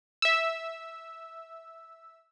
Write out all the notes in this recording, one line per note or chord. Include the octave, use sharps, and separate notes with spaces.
E5 E6